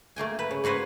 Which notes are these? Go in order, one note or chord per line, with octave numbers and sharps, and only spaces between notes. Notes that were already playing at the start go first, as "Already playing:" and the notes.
A3 A#3 G5 G#5
B4
C#3
A#3 F#4 B4 C5 G#5